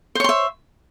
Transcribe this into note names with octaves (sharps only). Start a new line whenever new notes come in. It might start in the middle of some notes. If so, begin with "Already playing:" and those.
C5 C#5 E5 C6